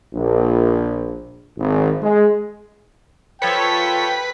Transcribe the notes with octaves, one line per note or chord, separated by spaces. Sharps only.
A#1
G#1
G#3
F3 A4 B4 C#5 G5